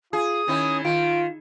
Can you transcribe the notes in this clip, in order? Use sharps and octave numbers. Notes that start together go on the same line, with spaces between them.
F4 G#4 D#6
D#3 C#4 E4
D#3 F4 D7